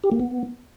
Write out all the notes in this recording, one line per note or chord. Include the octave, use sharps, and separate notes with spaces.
G4
A#3
B3